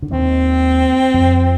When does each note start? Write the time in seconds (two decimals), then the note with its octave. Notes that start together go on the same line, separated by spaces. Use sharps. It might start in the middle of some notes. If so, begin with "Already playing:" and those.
0.02 D3
0.11 D#2 D#3 C4
1.14 F2 F3